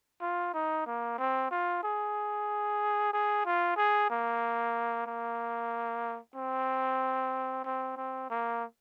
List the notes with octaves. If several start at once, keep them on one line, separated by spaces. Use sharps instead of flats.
F4
D#4
A#3
C4
F4
G#4
G#4
F4
G#4
A#3
A#3
C4
C4
C4
A#3